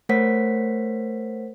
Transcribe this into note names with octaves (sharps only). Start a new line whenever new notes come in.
A3 A#4 C5 C#5 F#5 B6